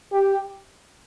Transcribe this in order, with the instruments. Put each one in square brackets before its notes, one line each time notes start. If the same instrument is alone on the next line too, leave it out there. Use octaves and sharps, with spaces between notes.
[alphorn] G4